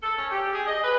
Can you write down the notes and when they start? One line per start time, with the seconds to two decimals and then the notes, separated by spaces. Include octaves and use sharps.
0.03 A4
0.18 C#4
0.31 G4
0.53 G#4
0.66 D#5
0.84 B4